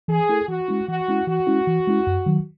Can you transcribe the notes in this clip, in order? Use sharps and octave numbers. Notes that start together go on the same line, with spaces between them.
E3 G#4
A3 E4 A4
E3 F#4
G#3 C#4 E4
E3 F#4
G#3 C#4 E4
E3 F#4
G#3 C#4 E4
E3
G#3 C#4 E4
F#2
D#3 F#3